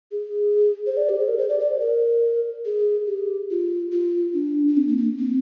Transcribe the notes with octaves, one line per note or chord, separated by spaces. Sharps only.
G#4
C5
D5
G4
G#4
A#4
C5
D5
D5
A#4
G#4
G4
F4
F4
D4
D4
C4
A#3
A#3
C4